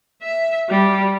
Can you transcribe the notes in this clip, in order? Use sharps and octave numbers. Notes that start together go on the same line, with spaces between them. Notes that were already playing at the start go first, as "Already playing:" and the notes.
E5
G3